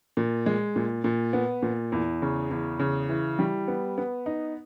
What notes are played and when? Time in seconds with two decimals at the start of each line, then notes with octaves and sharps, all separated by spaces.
0.17 A#2
0.46 G#3
0.76 A#2
1.04 A#2
1.33 B3
1.62 A#2
1.92 E2
2.22 C#3
2.50 E2
2.79 C#3
3.09 E3
3.39 G3
3.68 B3
3.98 B3
4.26 D#4